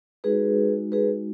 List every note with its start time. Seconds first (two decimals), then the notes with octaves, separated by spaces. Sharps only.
0.24 G#3 D#4 F#4 G#4 B4
0.92 G#4 B4